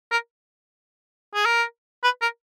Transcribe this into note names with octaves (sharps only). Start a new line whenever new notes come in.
A#4
G#4
A#4
B4
A#4